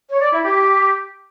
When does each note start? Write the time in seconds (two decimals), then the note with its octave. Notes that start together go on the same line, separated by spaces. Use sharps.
0.10 C#5
0.21 D5
0.33 E4
0.44 G4